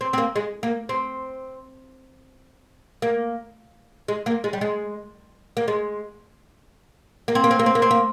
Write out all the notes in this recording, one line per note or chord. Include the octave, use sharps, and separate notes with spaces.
C4
C4
A#3
G#3
A#3
C4
A#3
G#3
A#3
G#3
G3
G#3
A#3
G#3
A#3
C4
A#3
C4
A#3
C4
A#3
C4
A#3